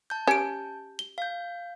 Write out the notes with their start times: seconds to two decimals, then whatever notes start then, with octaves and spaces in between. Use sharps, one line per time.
0.10 A5 G6
0.28 C#4 G4 D7
0.99 G7
1.18 F5 G6